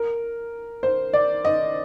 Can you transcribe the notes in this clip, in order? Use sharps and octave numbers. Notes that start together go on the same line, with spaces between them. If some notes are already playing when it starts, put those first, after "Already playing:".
Already playing: A#4
C5
D5
D#5